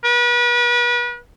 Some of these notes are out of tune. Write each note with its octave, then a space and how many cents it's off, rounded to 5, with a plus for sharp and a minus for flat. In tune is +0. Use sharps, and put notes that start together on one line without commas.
B4 -40